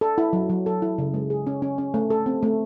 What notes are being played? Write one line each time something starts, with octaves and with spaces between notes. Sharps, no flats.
A4
E4
F#3
F#3
A4
E4
C#3
G#3
G#4
C#4
C#4
C#4
A3
A4
C4
A3